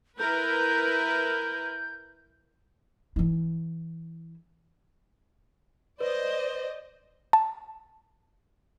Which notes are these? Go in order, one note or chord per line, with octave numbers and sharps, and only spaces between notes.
E4 A#4 B4 G6
E3 E4
B4 C5 D5 D#5
A5